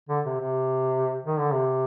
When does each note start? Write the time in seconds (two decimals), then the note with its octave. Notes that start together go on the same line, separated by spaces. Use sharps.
0.09 D3
0.26 C3
0.40 C3
1.25 D#3
1.39 D3
1.53 C3